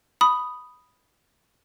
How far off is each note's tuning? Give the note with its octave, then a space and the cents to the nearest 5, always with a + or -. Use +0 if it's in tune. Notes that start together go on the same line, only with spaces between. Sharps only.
B5 +0 D#6 +0